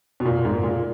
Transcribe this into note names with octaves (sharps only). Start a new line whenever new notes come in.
B2
A#2
G#2
A#2